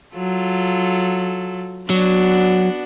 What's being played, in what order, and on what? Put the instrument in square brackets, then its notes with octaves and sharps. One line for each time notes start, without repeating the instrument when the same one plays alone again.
[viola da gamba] F#3 F4 A4
[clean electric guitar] F#3 [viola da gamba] B3 D4 F#4